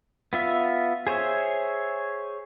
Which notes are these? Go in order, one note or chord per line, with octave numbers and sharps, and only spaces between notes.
B3 F4 E5
G#4 C5 C#5 E5